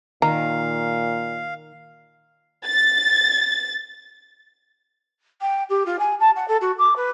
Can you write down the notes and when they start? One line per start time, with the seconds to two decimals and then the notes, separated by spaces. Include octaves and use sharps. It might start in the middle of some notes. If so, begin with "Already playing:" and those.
0.22 A#2 D#3 F5 A#5
2.66 A6
5.41 G5
5.69 G4
5.85 F4
5.99 G#5
6.20 A5
6.35 F#5
6.48 A4
6.61 F#4
6.78 D6
6.96 B4